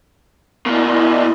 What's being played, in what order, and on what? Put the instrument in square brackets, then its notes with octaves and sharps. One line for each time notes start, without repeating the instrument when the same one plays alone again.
[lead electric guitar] B2 A#3 [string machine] E4 D5 D#5